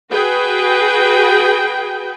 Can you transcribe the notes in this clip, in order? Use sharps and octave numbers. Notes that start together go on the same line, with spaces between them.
F#4 G#4 B4 G5